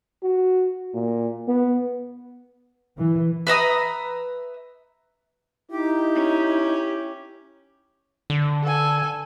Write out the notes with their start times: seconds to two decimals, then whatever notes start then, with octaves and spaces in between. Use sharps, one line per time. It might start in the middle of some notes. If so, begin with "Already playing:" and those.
0.23 F#4
0.94 A#2
1.47 B3
2.98 E3
3.47 B4 E5 A#5 D#6
5.71 D#4 E4 G4
6.15 C#4
8.30 D3
8.63 A4 G#5